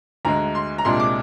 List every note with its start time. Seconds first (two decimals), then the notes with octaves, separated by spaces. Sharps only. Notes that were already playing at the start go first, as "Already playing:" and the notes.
0.25 D2 D3 G#3 A#5
0.55 C6
0.78 A#5
0.85 C2 A#2 G#3 D4 C6
1.00 D6